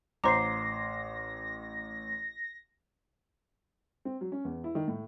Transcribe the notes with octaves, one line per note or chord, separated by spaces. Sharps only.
A1 C5 A#5 C6 D6 A#6 C7
C4
F#3
C#4
E2
E4
D#3
A2